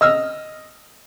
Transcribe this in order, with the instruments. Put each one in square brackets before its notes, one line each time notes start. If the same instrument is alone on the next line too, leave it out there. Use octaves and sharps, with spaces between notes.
[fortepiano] D#5 E6 F6